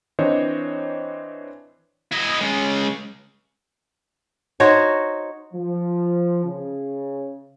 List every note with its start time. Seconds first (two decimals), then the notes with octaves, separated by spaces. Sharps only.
0.19 E3 C4 D4 C5 C#5 D#5
2.12 E4 D#5
2.41 G#3 C#4
4.60 D#4 F#4 C5 C#5
5.53 F3
6.44 C#3